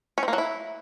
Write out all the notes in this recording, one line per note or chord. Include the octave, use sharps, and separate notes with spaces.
C#4
C4
A#3
F#3
E4